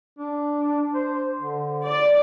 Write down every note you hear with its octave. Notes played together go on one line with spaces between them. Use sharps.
D4
C5
D3
D5